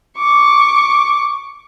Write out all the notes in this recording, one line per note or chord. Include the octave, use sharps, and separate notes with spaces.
C#6 D6